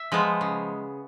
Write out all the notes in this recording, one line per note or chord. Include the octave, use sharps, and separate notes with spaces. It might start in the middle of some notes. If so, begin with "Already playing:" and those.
Already playing: E5
F3 G#3 B3
C#3